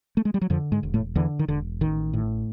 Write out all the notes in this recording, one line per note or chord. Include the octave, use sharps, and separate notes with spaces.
A3
G#3
G3
F#3
F2 D3 F3
G#2 G#3
E1
A2 A3
E2 D3 E3
D#3
E1 D3
A1 D#3
A2